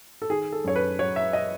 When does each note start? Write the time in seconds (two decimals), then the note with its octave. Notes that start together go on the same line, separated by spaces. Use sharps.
0.22 A4
0.30 D#3 G#4
0.52 A4
0.64 F#2 C#5
0.76 B4
0.99 F#3 C#5
1.16 E5
1.33 D#5